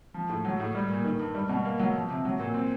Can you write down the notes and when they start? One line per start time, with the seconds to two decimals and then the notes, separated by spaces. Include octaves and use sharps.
0.14 F3
0.29 A2
0.45 F#3
0.60 A2
0.75 G3
0.89 A#2
1.04 D#3
1.19 G2
1.35 G3
1.49 B2
1.65 A#3
1.80 F#3
1.95 F3
2.10 C3
2.25 F#3
2.40 A#2
2.54 C4